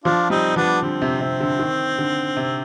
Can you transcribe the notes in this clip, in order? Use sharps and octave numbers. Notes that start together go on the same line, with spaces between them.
F3 D4 F4
G3 C4 D#4
F3 B3 D4
D3 C4
C3
C3
D3
D#3
D3
C3